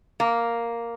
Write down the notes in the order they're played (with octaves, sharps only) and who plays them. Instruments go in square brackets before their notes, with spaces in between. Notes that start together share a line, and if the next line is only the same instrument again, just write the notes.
[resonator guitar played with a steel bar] A#3